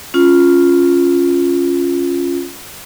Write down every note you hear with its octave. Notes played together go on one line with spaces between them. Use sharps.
C#4 F4